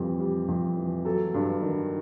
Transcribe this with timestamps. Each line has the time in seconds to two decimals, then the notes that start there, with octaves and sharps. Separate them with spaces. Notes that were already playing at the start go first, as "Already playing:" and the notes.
Already playing: F2 E3 G3
0.20 G3
0.48 F2
0.78 E3
1.05 F#3 A4
1.34 G2
1.62 D#3